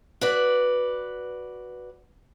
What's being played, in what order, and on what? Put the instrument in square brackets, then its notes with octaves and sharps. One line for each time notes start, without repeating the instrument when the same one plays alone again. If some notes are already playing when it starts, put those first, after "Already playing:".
[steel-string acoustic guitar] F#4 B4 D5